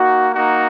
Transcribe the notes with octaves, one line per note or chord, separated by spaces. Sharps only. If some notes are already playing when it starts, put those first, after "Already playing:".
Already playing: A#3 D#4 F#4
A#3 D#4 F#4